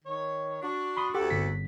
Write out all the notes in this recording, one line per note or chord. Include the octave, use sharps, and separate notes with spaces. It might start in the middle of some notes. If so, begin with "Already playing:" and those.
D#3 C#5
D4 F#4
B5 C6 D#6
D2 G4 A4 F#5
G1 B6